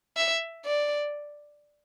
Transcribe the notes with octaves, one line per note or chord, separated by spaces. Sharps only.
E5
D5